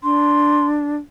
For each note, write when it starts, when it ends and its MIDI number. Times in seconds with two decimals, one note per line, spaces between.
0.03 0.96 62
0.03 0.67 84